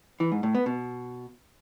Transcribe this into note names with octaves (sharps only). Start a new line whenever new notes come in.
E3
G#2
A2
B3
B2